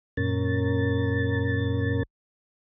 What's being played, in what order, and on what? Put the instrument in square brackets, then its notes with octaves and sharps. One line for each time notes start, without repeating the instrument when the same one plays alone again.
[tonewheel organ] F#2 A#2 C#4 A#4 A6